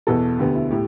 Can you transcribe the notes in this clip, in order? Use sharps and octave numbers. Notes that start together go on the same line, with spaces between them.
E2 B2 B3 A4
D2 D3 B3 G4
E4
A2 A3 G4